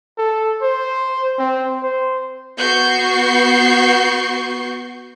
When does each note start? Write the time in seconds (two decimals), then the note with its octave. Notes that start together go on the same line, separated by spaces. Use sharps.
0.18 A4
0.62 C5
1.39 C4
1.82 C5
2.58 B3 F#4 C#6 G6 C7